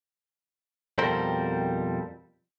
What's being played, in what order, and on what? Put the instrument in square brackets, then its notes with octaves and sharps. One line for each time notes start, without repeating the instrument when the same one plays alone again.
[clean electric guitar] F2 B2 G3 C4 A#4 C5